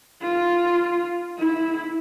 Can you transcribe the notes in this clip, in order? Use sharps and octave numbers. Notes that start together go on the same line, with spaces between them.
F4
E4